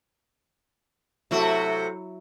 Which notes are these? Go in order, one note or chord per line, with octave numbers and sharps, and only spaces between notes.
C3 F#3 A3 E4 F#4